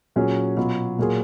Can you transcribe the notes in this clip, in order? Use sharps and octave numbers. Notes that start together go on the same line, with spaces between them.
A#2 F#3 C#4 G#4
B2 F#3 B3 F4
A#2 F#3 A#3 F4 G#4